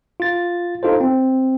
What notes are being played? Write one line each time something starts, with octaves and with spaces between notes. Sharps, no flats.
F4 A6
D#4 F4 A4 C5
C4